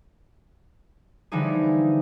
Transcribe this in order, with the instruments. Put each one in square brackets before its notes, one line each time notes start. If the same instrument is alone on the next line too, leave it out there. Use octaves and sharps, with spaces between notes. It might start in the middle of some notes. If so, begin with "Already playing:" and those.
[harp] D3 E3 F3 G3 D#4 G#4